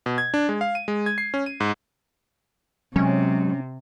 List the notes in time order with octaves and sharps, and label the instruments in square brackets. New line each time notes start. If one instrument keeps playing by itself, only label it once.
[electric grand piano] B2
G#6
D4
G#3
F5
D#7
G#3
G#6
C7
C#4
D#7
G#2
[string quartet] C3 [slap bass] F#3 G#3 [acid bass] C#4